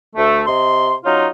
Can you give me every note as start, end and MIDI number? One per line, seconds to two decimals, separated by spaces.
0.16 0.43 38
0.16 0.43 57
0.47 0.94 48
0.47 0.94 75
0.47 0.94 84
1.05 1.27 54
1.05 1.27 61
1.05 1.27 63
1.05 1.27 65